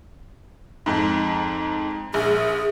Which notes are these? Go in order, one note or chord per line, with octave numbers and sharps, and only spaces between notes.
F2 G#2
A#1 G#4